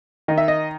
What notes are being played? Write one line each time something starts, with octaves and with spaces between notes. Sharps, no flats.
D#3 D#5
E5
D#5